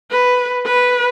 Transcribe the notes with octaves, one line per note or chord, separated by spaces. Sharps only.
B4
B4